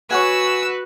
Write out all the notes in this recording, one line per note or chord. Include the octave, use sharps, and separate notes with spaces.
F#4 B4 C#5 F#5 G#5 E6